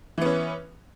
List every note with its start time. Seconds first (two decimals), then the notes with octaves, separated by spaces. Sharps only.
0.18 E3
0.21 B3
0.25 C#4